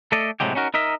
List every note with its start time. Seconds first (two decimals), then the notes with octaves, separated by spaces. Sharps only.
0.12 A3 A4 D5 D#5
0.40 A2 C3 F3 F#3 G#3 G4
0.55 C#4 D#4 F#4 A#4
0.74 D#4 A#4 D#5 E5